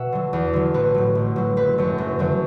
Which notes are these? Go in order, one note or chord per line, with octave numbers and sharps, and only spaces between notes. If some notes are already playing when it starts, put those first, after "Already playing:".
Already playing: B2 E5 F#5
D3 F#3
E2
D3 F#3
A1 B4
A2 F#3
A1
A2 F#3
F#1 B4
F#2 D3 F#3
F#1
F#2 D3 F#3